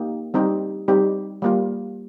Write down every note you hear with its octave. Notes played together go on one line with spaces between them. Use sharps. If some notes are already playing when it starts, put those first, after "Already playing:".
Already playing: A#3 D#4 G4
G3 C4 D#4 G4
G3 C4 D#4 G4
G3 A#3 F4